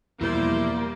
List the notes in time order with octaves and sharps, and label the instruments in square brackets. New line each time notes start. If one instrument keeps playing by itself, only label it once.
[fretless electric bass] E2 B2 F3 [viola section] G3 C5 D5 [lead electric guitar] A#3 [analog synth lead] E4